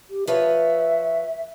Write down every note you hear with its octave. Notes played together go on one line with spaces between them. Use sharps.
G4
F3 B4 C#5 E5